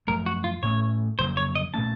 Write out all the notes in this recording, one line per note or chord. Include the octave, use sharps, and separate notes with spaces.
F#2 F3 A3 A#4
F#4
F4
A2 A3 C#4 C#5
F2 C#3 F#3 A#3 C5
C#5
D#5
A#2 A3 C#4 A5